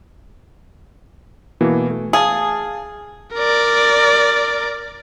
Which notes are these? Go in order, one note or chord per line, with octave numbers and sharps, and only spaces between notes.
B2 E3 A#3
A3
G#4 F5 A5
A#4 D5